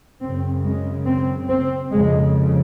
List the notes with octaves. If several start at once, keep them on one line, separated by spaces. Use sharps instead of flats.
F#2 C#3 C4
G#3
C4
C4
F2 C#3 G#3